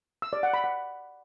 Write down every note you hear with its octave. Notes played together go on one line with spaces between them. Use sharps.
E6
D5
F#5
B5
F#5